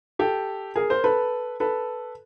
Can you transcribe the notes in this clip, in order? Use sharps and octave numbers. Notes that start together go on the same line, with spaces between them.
G4 A4
G#4 A#4
A#4 C5
A4 B4
A4 B4